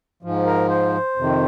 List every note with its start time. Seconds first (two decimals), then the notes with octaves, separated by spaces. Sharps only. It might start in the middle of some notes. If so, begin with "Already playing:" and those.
0.23 G#2 F3
0.46 A#4
0.69 C5
1.16 F2 C3 D#3